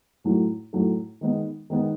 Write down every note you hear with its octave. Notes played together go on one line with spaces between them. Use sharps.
A2 F#3 A3
A2 F#3 A3
D#3 G#3 B3
D#3 G#3 B3